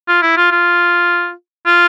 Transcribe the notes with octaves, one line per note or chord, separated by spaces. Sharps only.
F4
E4
F4
F4
F4